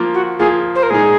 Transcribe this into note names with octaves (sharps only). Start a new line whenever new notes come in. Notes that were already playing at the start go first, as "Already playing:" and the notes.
Already playing: F3 A#3 F4
F#4
F3 A#3 F4 G#4
C5
A#4
A#2 G#3 D#4 G#4